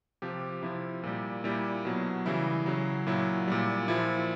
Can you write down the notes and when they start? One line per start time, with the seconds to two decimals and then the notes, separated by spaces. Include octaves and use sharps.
0.22 C3 F3 G4
0.63 C3 F3 E4
1.03 A#2 G3
1.44 A#2 G3 E4
1.85 B2 F#3
2.26 C#3 E3 G3 E4
2.66 C#3 F#3
3.07 A#2 F#3 E4
3.48 A#2 G3
3.88 A#2 F3 E4